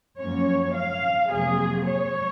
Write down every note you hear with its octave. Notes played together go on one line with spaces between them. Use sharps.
F#2 F3 A#3 C#4 C#5
F5
F2 C3 F#3 A#3 G#4
C#5